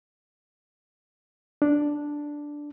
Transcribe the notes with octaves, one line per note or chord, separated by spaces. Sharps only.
D4